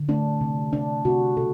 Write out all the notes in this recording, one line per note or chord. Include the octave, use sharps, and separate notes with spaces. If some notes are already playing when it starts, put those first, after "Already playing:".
Already playing: D3
A3 D4
C3
C3 D4
C3 F#4
B2 A4